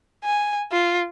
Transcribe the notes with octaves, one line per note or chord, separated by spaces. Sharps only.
G#5
F4